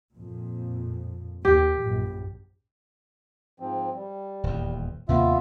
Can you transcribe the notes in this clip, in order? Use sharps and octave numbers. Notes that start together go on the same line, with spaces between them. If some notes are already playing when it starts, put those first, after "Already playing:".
F2 A#2
D#2 G4
A#1 F#2
G#2 F3 C4
G3
D#1 E2
D#2 C3 A#3 B3 F4 E5